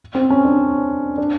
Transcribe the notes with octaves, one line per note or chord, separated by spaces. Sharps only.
C4
C#4
D4
D4